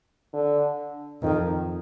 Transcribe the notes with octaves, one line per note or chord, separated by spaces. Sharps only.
D3
F2 D#3